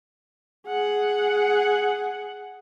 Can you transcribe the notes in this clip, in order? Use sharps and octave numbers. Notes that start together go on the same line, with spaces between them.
G#4 F#5